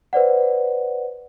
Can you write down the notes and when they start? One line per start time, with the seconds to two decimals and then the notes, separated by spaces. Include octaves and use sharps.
0.13 B4 C5 D5 F#5